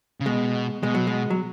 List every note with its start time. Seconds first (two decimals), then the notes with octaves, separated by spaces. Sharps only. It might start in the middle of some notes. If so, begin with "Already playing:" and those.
0.20 C#3
0.26 B2 G#3
0.83 B2 G#3
0.94 F#3
1.07 G#3
1.30 F#3